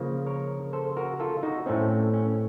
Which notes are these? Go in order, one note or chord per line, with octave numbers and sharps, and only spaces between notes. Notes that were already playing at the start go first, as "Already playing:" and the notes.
Already playing: C#3 F3 A#3
A#4 C#5
A4 C5
F#4 A#4
F4 A4
D#4 F#4
A2 A3 C4 C#4
C#4